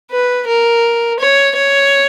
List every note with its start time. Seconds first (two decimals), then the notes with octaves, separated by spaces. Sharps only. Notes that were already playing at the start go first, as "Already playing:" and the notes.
0.11 B4
0.47 A#4
1.20 C#5
1.57 C#5